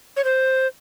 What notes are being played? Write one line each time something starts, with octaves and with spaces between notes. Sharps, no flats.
C#5
C5